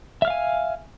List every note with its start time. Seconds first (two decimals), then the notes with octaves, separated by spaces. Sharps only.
0.22 E5
0.25 F6
0.28 F5
0.30 G#5